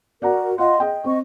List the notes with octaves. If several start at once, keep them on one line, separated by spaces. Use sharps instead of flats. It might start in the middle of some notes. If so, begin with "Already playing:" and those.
F#4 A#4 D5 F#5 A#5
F4 D#5 F5 F#5 C6
G#4 D#5 G5
C4 D#5 C#6